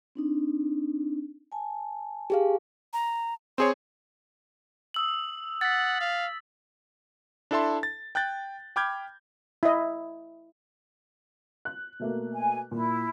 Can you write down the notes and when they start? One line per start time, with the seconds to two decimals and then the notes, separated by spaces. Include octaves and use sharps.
0.15 C4 D4 D#4
1.52 G#5 A5
2.30 G4 G#4 F5
2.93 A#5
3.58 C4 G#4 C#5 C6
4.94 D#6 E6 F#7
5.61 F#5 A6 B6
6.01 F5
7.51 D4 E4 A4 E5 A5 C6
7.83 A6
8.15 G5 F#6 G6 A6
8.76 G5 B5 D6 F6 G6 G#6
9.63 E4 D#5
11.65 F#6
12.00 B2 A3 A#3
12.33 G#5
12.71 A#2 E4